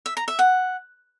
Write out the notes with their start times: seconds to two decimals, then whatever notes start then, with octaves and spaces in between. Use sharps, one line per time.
0.06 E5
0.17 A#5
0.28 E5
0.39 F#5